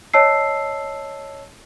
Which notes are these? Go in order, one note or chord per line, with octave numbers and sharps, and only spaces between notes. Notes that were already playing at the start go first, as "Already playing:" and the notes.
C#5 D#5 A5 E6 C7